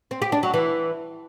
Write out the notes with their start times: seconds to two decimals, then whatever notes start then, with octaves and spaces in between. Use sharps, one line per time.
0.11 C4
0.22 G4
0.32 D4
0.43 F#3
0.54 E3